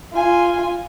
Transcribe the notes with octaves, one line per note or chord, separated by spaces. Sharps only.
F4 G#5